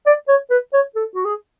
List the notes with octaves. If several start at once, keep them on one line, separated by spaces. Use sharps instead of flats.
D5
C#5
B4
C#5
A4
F#4
G#4